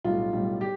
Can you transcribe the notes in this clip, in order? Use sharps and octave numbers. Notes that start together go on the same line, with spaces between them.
B1 A2 G3 F4
B1 A2 G3
G4